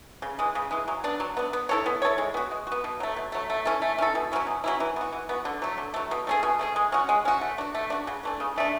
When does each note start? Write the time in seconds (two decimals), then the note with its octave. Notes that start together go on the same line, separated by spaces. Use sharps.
0.22 C#3
0.39 E3 G#3
0.55 C#3
0.71 E3 G#3
0.88 F#3
1.04 B3 D4
1.20 F#3
1.37 B3 D4
1.53 B3
1.69 E4 A4 C#5
1.86 B3
2.02 E4 A4 C#5
2.18 G#3
2.34 B3 F#4
2.51 G#3
2.67 B3 F#4
2.84 B2
3.00 F#3 A3
3.16 B2
3.32 F#3 A3
3.50 A3
3.65 C#4 E4 A4
3.82 A3
3.98 C#4 E4 A4
4.15 B2
4.31 F#3 C#4 E4
4.47 B2
4.64 F#3 C#4 E4
4.80 E3
4.96 B3 F#4
5.12 E3
5.29 B3 F#4
5.45 D3
5.62 F#3 A3
5.78 D3
5.94 F#3 A3
6.11 B2
6.27 A3 C#4 G#4
6.43 B2
6.59 A3 C#4 G#4
6.76 G#3
6.92 C#4 F#4
7.09 G#3
7.25 C#4 F#4
7.41 A3
7.58 D4 F#4
7.75 A3
7.90 D4 F#4
8.07 C#3
8.23 E3 A3 D4
8.40 C#3
8.56 E3 A3 D4